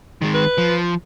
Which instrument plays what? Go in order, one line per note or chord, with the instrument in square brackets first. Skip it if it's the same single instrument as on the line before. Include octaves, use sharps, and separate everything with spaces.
[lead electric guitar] D#3 G#3
[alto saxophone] B4
[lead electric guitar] F3